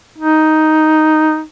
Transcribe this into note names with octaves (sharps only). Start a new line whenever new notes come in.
D#4